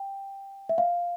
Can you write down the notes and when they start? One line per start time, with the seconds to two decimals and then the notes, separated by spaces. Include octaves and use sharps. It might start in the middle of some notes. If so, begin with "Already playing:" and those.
Already playing: G5
0.69 E5
0.78 F5